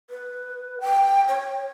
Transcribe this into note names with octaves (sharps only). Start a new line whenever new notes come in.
B4
G5
C#5